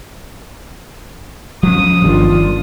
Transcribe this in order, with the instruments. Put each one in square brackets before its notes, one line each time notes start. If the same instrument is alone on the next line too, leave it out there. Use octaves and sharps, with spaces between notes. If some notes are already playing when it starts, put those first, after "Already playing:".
[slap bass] F3 F#3 C#4 [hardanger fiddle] D#6
[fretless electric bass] G1 G2 D#3 [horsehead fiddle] D4 F4